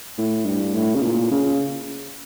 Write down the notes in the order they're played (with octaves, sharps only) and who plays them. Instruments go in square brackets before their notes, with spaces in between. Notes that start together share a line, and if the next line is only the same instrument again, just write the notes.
[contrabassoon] A2
G2
A2
C#3
A#2
C#3